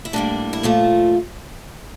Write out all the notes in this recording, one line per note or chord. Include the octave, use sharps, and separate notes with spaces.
E4
A2 G3 A#3 D4
E4
A#2 F3 A3 F4